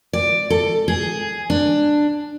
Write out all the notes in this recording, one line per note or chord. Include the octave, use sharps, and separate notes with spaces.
D5
A4
G#4
D4